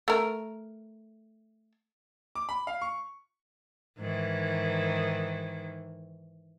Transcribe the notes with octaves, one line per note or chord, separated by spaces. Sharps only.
A3 A#4
D6
B5
F5
C#6
G#2 D#3 E3